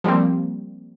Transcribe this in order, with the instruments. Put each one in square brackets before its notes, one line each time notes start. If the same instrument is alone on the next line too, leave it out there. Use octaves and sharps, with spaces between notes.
[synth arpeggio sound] F3 G3 A#3 C4